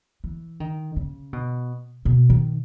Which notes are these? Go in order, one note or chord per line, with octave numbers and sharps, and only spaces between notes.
E3
D#3
C#3
B2
B2
D#3